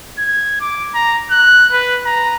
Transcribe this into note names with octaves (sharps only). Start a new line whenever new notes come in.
G#6
D6
A#5
F#6
B4
A#5